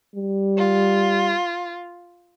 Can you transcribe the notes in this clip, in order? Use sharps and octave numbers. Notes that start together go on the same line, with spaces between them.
G3
F4